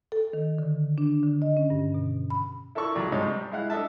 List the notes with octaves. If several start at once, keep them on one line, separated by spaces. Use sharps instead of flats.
A4
D#3
D3
D4
D3
D#5
C#4
G2
B2
B5
E4 A4 A#4 D5 C#6 E6
C#2 F#3 D5
G#2 C3 G3 C#5 D#5 A5
G3
G#3 E4 F5 F#5
D4 A4 D#5 E5 A5